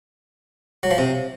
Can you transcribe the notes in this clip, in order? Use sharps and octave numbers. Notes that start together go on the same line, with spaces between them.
F#3
F3
C3